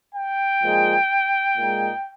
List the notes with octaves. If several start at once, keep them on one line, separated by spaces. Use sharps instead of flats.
G5
A#2 F3 G#3 D#4
A#2 G#3 D#4